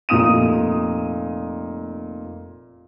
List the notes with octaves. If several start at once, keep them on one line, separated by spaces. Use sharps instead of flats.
F1 A#2 D#6 D#7